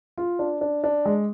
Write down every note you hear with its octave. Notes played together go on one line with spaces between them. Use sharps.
F4
D4
D4
D4
G#3